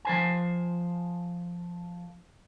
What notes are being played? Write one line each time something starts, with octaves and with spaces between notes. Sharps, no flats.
F3 C5 G#5